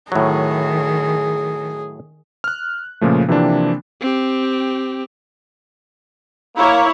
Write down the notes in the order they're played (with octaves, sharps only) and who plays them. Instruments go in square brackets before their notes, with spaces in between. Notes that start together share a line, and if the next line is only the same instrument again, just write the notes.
[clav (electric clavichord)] A2 F#3 [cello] D#3 [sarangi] G#4
[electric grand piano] F6 F#6
A#2 C#3 F3 A3
C3 E3 F3 A#3 C4 D4
[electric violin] C4 G4
[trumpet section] A#3 [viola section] E4 C#5